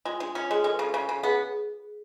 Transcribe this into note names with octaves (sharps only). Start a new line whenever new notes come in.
G#3 F4
G#3 D4
C#4 F4
G#3 G#4
G#3 A4
B4
C#3 A4
C#3
C#3
B3 G#4